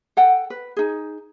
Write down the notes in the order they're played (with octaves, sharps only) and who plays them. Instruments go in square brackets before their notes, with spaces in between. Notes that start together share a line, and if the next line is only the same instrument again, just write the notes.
[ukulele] A4 F#5 G5
B4
D#4 G#4